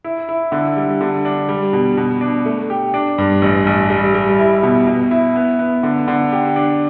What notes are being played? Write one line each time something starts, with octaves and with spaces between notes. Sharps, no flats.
E4
E4
D3
G3
D3
D4
G3
B2
B2
D4
A3
G4
D4
G2
A1
A1
G3
G3
E4
B2
B2
E4
B3
B3
D3
D3
G4
D4